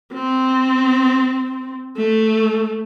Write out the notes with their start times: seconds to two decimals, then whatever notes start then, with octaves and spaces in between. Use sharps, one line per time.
0.13 C4
1.97 A3